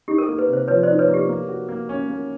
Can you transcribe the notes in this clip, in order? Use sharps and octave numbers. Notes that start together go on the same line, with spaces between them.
D#4 G4
A#4
A4
A#3
B4
C3
C5
F3 B4 C#5
C5 D5
D#4
B4 C#5
A#3
G4
A#3
F#4
A#3
C#4
A#3